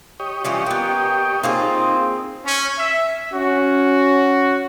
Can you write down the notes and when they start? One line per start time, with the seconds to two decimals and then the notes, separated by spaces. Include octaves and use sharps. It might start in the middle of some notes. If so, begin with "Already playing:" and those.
0.20 G4 C#5 D#5
0.45 E3 G3 C#4 F4
0.66 A#3 B3 G5
1.43 A#3 C4 D#4 F4 G#4
2.45 C#4
2.78 E5
3.33 C#4 F#4